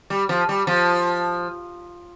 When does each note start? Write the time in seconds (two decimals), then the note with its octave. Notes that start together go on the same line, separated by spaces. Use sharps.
0.10 G3
0.29 F3
0.49 G3
0.67 F3